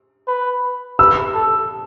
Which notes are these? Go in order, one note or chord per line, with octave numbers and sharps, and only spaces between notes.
B4
B4 E6
A4